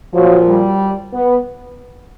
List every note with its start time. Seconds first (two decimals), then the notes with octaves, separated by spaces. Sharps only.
0.14 A#2 F3 F#3
0.47 G3
1.14 B3